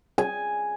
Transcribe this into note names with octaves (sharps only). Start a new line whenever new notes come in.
G#5